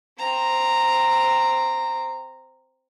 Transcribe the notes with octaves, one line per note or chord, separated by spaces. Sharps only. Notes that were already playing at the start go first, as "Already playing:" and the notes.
C4 A#5